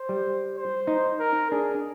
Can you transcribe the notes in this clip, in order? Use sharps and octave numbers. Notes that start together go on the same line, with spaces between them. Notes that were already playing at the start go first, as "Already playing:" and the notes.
Already playing: C5
G3
C5
D#4
A#4
D4 G#4